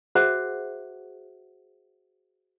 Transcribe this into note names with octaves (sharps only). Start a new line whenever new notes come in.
F#4 G#4 C5 E5 F#5